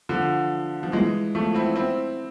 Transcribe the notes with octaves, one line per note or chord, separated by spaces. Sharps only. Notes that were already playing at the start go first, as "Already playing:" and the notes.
D3 F3
F3
E3 G#3
F3 A3
C4 E4
C4 E4